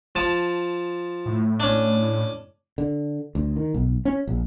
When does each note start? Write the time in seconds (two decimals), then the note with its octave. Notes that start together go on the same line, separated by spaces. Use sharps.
0.15 F3 A5
1.26 A2
1.60 C#4 D4
2.78 D3
3.35 D2
3.56 D#3
3.74 B1
4.05 C#4
4.27 A#1